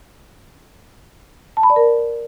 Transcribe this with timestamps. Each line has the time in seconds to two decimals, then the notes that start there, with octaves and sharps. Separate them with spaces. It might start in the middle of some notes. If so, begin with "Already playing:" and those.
1.57 A5
1.63 B5
1.70 D5
1.76 A#4